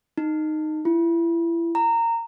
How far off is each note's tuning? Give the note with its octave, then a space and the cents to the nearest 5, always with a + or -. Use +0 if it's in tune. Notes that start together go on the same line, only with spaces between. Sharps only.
D#4 -10
E4 +30
A#5 -15